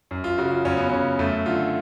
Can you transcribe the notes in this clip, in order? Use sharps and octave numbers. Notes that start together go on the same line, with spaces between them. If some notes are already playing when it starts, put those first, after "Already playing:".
F#2
F4
C#3 F#4
F4
F#2 C#4
B3
C#3 C#4
F#2 A3
D3 F4